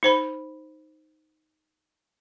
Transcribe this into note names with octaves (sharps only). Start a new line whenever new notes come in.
D#4 C5 B5